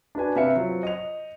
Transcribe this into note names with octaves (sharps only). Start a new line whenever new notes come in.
D4 F#4 B4 G#5
C3 B4 E5 F5 C#7
F#3 F4 C5
D#5 F7